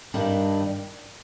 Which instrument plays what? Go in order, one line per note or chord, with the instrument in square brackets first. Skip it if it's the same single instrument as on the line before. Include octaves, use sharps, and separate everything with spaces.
[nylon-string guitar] G2 D#3 G3 D4